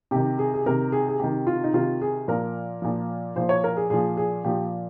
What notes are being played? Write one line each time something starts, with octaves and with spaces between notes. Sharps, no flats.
C3 D#3 G4
G#4
G#4
C3 D#3 A#4
G#4
G#4
C3 D#3 G4
F4
D#4
C3 D#3 F4
G#4
A#2 F3 A#4
A#2 F3
A#2 F3 C5
C#5
A#4
G#4
A#2 F3 G#4
G#4
A#2 F3 G4